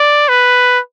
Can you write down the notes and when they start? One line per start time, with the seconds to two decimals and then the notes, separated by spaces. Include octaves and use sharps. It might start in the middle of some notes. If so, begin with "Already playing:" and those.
Already playing: D5
0.29 B4